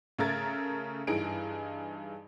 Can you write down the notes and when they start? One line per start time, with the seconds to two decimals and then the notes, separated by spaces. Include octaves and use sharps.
0.19 C#3 A3 A4 A#4 G#6 A6
1.07 G2 E3 D#4 G#4 D7